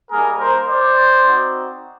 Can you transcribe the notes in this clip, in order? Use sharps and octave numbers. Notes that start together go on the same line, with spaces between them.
G3 A#3 D#4 G#4 A#4
A#4 C5
C5 D5
C4 D#4 F#4